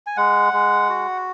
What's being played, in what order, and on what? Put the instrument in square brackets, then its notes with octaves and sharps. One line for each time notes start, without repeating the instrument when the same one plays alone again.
[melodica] G#5
G#3 F#5
G#3
F#4